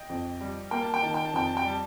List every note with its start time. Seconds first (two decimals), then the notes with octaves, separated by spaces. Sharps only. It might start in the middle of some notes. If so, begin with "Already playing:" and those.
Already playing: D#5 G5
0.10 F2
0.41 G3
0.71 A#3 G5
0.82 A5
0.94 G5
1.02 D#3 A5
1.14 G5
1.25 A5
1.34 F2 G5
1.47 A5
1.57 G5
1.65 G3 A5